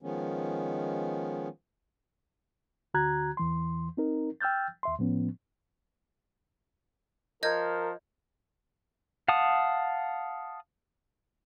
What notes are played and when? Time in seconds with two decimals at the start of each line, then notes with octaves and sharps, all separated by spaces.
0.02 D#3 F3 G#3 B3 C#4
2.94 D2 D3 F#4 A#5 F#6 G#6
3.37 E2 E3 C6
3.97 C4 D#4 A#4
4.41 G5 E6 F6 G6 A6
4.83 D#2 E5 C6
4.99 A2 F3 B3 C#4
7.43 F3 A#4 D#5 G6 G#6
9.28 F5 F#5 A5 D#6